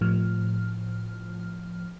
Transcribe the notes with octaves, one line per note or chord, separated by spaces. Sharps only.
A2 F3 F6